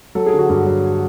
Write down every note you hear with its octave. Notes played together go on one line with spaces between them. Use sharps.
F#3 A4
G#4
D3
F#4
G2
F#3